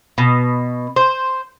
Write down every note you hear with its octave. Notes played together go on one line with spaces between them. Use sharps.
B2
C5